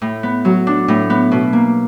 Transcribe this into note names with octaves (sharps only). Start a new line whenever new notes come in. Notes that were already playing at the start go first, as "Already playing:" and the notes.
A2
B3
F#3
D4
A2
B3
B2
A#3